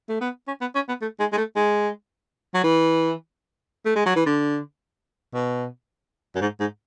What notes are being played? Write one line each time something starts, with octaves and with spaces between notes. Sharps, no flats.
A3
B3
C#4
B3
C#4
B3
A3
G#3
G#3
A3
G#3
F#3
E3
A3
G#3
F#3
E3
D3
B2
F#2
G#2
G#2